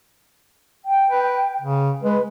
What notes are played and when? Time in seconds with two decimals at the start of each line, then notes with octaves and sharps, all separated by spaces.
0.86 G5
1.10 B4
1.62 C#3
2.03 G#3 B4